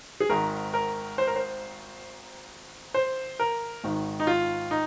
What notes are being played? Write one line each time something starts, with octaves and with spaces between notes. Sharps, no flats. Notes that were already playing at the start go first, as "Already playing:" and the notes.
G#4
G#1 G#2 D#3 A#4
A#4
C5
A#4
C5
C5
A#4
G#1 G#2 D#3
D#4
F4
D#4